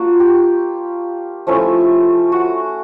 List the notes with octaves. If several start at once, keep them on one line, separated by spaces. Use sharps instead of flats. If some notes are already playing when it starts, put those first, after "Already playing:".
Already playing: A#3 D4 F4 F#4
G4
F3 A3 C#4 E4
F#4